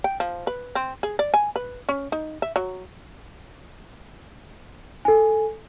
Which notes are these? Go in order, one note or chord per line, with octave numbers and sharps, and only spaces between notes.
G5
F3
B4
C4
G#4
D5
G#5
B4
C#4
D#4
E5
F#3
A4 G#5